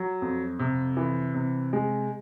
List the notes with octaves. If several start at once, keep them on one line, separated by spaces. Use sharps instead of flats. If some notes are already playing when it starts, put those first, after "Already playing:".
Already playing: F#3
F2
C3
E3
C3
G#3